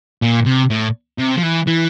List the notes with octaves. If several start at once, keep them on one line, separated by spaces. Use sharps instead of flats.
A#2
C3
A2
C3
F3
E3
E3